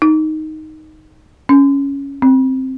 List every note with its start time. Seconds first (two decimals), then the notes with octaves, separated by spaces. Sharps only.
0.02 D#4
1.49 C#4
2.22 C4